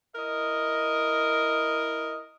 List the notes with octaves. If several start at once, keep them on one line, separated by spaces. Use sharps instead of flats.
E4 A#4 D#5